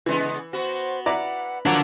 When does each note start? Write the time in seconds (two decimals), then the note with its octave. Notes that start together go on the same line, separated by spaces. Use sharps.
0.06 C#3 E3 G#3 B3
0.53 B3 F#4 C5
1.06 E4 B4 D5 F#5 A#5
1.66 F3 F#3 A#3 D4 F#5 D6